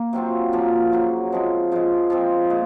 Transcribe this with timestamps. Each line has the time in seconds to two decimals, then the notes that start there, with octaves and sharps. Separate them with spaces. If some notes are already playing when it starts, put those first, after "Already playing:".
Already playing: A#3
0.13 C3 F#3 C4 F4
0.53 C#3 F3 A#3
0.92 F#2 C#3 F#3
1.32 C3 F3 G#3
1.72 C#3 F3 G#3
2.10 F3 G#3 C4
2.50 A#2 G#3